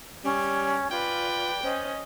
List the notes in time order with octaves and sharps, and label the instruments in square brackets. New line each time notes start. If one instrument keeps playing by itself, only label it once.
[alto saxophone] G3 [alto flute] C#4
[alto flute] F4 [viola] B4 D5 [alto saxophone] G5
[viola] C#4 D#5 [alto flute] C5